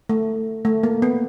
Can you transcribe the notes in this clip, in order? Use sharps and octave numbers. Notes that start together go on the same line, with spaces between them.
A3
A3
A#3
B3